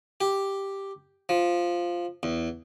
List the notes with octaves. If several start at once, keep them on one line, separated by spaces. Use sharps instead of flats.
G4
F3
E2